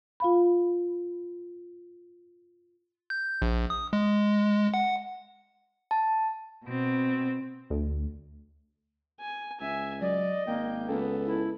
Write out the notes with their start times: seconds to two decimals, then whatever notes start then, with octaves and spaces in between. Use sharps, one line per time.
0.20 F4 F5 B5
3.10 G6
3.42 A#1
3.70 D#6
3.93 G#3
4.74 F#5
5.91 A5
6.65 B2 C4
7.70 D2
9.20 G#5
9.60 C#2 E5 G#5
10.01 F#3 D5 D#5
10.47 G#1 A#3 G5
10.89 C#2 B3 A4
11.26 E4